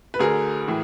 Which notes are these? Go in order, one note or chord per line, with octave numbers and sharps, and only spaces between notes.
B4
D2 D3 G#4 A#4
A2 E3